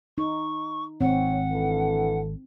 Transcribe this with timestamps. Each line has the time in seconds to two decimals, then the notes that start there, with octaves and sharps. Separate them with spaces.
0.18 D#4 C#6
1.01 G#1 C4 C#5 F#5
1.52 D3 E3 A4